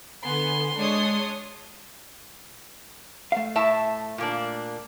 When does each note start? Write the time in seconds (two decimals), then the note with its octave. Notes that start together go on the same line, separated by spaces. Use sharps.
0.24 D3 B3 G#5 C6
0.76 G#3 D4 C#5 D#6
3.32 A3 F5
3.55 A2 E5 A5
4.18 A#2 A#3 D4